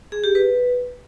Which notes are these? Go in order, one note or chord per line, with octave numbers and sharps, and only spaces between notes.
G#4
G4
B4